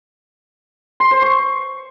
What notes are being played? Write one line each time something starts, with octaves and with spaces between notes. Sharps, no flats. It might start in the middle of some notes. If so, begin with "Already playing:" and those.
C6
C5
C#6